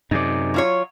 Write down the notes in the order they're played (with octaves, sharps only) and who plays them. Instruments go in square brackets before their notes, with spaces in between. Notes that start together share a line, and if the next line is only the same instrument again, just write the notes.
[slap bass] F#2 C3 [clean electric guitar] D#4 G#4 D5
[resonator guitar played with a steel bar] F#3 F4 C#5